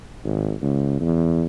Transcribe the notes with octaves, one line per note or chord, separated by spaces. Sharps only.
G#1
C#2
E2